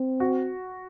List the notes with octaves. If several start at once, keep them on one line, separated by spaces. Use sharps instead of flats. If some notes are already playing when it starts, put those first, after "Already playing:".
Already playing: C4
F#4